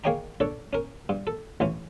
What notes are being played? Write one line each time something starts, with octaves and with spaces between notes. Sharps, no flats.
A#3 G#4 C#5 D#5 G5 A#5
D4 A4 C#5
C#4 A#4
G2
A4
A1 E3 C#4